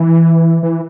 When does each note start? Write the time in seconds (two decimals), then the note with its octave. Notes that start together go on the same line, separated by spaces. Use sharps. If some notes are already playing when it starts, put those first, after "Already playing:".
Already playing: E3
0.63 E3